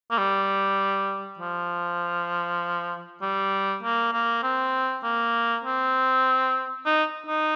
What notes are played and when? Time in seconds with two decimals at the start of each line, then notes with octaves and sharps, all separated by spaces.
0.11 A#3
0.18 G3
1.39 F3
3.21 G3
3.83 A#3
4.13 A#3
4.43 C4
5.03 A#3
5.64 C4
6.86 D#4
7.26 D#4